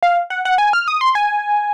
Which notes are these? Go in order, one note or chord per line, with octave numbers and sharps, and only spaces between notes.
F5
F#5
F#5
G#5
F6
D#6
C6
G#5